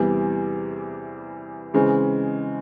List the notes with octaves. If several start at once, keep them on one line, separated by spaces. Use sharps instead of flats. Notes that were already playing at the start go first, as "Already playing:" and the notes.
Already playing: E2 C3 E3 G3
C#3 E3 G#3 C4